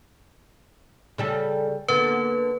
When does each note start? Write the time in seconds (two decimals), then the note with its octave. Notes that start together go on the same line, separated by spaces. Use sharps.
1.18 C#3 G3 A4
1.88 D3 A#3 B3 B4